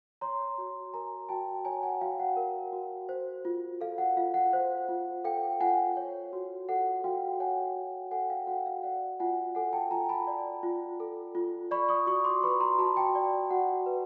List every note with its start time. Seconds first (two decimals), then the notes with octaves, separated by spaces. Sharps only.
0.21 C#5 A#5 C6
0.58 F#4
0.93 A#4 G#5 A#5
1.29 F#4 G5 A5
1.65 C#5 G#5 A#5
1.83 F#5 G#5
2.01 F#4 F5 G5
2.20 F#5
2.37 A#4
2.73 F#4
3.09 C5
3.45 F4
3.81 A4 F5
3.98 F#5
4.17 F4 F5
4.34 F#5
4.53 C5
4.89 F4
5.24 A4 F5 G5
5.60 F4 F#5 G#5
5.97 C#5
6.33 F#4
6.69 A4 F#5
7.04 F#4 F5 G5
7.40 C#5 F#5 G#5
7.76 F#4
8.11 A4 F#5 G#5
8.30 F5 G5
8.47 F#4 F#5
8.66 F5
8.83 D5 F#5
9.20 F4 F#5 G#5
9.55 A4 F#5 G#5
9.73 G5 A5
9.91 F4 G#5 A#5
10.09 A5 B5
10.27 D5
10.63 F4
11.00 A4
11.35 F4
11.71 D5 B5 C#6
11.88 C#6 D#6
12.07 F#4 C#6 D#6
12.24 C6 D6
12.43 B4 B5 C#6
12.60 A#5 C6
12.78 F#4 A5 B5
12.97 G5 A5
13.15 D5
13.50 F#4 F#5
13.86 B4